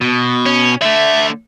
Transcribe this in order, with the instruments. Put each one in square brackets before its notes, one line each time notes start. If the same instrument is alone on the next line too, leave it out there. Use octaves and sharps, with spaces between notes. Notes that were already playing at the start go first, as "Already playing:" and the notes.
[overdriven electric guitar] B2
[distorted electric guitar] C#4
[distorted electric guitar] D3 A3 [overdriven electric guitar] E5